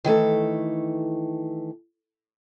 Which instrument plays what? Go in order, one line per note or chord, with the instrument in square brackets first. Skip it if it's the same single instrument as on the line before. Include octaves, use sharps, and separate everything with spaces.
[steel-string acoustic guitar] D#3 E3 A3 A4